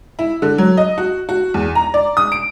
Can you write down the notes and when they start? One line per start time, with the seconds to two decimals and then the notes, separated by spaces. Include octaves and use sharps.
0.19 E4
0.42 D3
0.58 F#3
0.77 D#5
0.98 F#4
1.29 F#4
1.54 E2
1.75 A#5
1.94 D5
2.17 D#6
2.32 D7